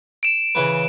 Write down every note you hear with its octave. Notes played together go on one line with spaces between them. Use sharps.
D7 E7
C#3 E3 B4